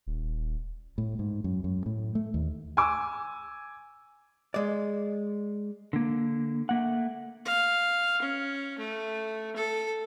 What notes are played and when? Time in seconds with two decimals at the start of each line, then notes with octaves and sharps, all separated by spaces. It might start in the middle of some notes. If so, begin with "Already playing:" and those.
0.07 D#1
0.98 A2
1.19 G#2
1.44 F#2
1.64 F#2
1.86 A2
2.15 A3
2.34 D#2
2.77 G#5 D6 E6
4.54 G#3 D5
5.93 D3 A#3
6.69 A3 A#3 F#5
7.45 F5
8.22 C#4
8.78 A3
9.56 A4